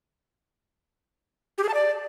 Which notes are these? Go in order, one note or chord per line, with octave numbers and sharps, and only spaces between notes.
G4
G#4
A5
D5